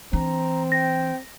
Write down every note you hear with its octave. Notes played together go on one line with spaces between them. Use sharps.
E3 C4 D4 A#5
G5 A#6